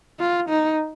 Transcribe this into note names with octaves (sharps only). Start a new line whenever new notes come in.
F4
D#4